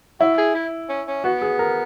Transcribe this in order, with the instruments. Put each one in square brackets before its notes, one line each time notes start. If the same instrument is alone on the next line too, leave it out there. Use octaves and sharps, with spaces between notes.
[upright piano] E4 [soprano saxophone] F#4
[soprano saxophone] G#4
E4
C#4
C#4
[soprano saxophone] B3 [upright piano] F#4
[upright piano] G#4
A#4